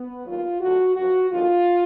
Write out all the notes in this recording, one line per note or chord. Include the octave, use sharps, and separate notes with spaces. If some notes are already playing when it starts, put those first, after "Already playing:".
Already playing: B3
D#2 D#3 F#3 F4
D2 D3 F#3 F#4
F#2 F3 F#4
D#2 D3 F3 F4